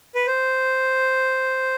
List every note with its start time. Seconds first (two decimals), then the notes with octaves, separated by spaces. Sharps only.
0.15 B4
0.27 C5